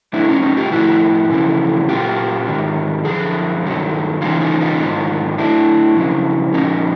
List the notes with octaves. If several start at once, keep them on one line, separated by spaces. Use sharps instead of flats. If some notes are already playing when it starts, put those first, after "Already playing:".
A2 F#3 D4 E4
C#4 D#4
C#4 D#4
F4 G4
A2 F3 E4 F#4
F2 C#3 E3
A#2 F#3 F4 G4
G#2 D#3 F#3
F#2 D3 F3 G#4
G2 D#3 F#3
F#2 C#3 E3 D#4 F4
D#4 F4
D#4 F4
G#2 D#3 F#3
A2 F#3 D4 E4
F2 C#3 F#3
A#2 F3 C#4 D#4